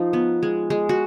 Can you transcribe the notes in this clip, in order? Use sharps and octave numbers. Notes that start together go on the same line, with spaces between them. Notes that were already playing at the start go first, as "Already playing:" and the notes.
Already playing: F3 D#4 F4
B3
G#3
G#3
F#4